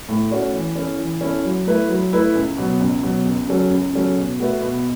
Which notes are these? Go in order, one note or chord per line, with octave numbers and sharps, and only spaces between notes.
A2
A3 C#4 F#4 C#5
E3
C#4 E4 A4
E3
C#4 E4 A4
F#3
A3 E4 B4 E5
F#3
A3 E4 B4 E5
C#2
B2 F#3
C#2
B2 F#3
C#2
C#3 F#3 C#4 A4
C#2
C#3 F#3 C#4 A4
B2
A3 F#4 B4 E5
B2